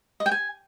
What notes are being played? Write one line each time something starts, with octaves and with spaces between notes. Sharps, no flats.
D#5
G5
G#5